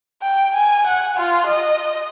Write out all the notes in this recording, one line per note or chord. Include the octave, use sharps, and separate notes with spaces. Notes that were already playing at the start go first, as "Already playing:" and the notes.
G5
G#5
F#5
F4
D#5